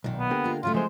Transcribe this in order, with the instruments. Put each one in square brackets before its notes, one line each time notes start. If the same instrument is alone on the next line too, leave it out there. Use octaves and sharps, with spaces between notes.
[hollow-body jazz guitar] B1 [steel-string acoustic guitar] A#2 D#3
[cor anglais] B3
[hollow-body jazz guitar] D3 A#3 G4
[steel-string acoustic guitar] G#3 F4
[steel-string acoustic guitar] C#3 F#3 A3 [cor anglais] F4
[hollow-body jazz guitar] F3 C5 [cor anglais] G#3